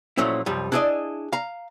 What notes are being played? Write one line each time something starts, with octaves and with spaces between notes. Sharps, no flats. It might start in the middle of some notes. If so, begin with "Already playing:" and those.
A#2 F3 F#3 A3 C#4 E4
C2 F#2 F3 G3
D4 E4 G#4 C5 D5 D#5
F5 A#5